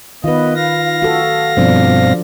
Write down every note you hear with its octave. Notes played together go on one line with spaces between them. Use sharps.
D#3 B3 F4 B4 D#5
F5 A#6
F#4 A4
G2 B2 F3 C4 D4